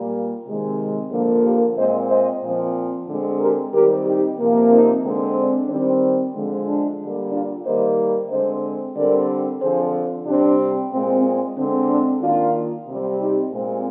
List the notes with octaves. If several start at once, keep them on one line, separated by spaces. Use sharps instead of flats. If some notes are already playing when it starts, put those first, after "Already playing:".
Already playing: A#2 G3 A#3
C3 D#3 G#3 C4
D3 F3 A#3
G4 A#4
A#2 G#3 C4 C5 D#5
C5 D#5
A#2 F3 C4
D3 G#3 C4
G4 A#4
D#3 G3 C4 G4 A#4
D#4 G4
C3 F3 A#3
C4 D#4
D3 G#3 C4
D4
D#3 G3 C4
D3 F3 G#3
D4
D3 G3 A#3
D4 F4
D#3 G3 A#3 C5 D#5
D3 G#3 C4 C5 D#5
D3 G3 C4 A#4 D5
D3 F3 C4 G#4 C5
C3 G3 C4 D4
A#2 G#3 C4
C4
D3 G#3 C4
D4
D#3 A#3 D4 F4
C3 G3 C4
D#4 G4
A#2 G#3 C4